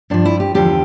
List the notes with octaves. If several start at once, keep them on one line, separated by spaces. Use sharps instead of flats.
G2 F3 D4
E4
G4
E2 D3 F3 G4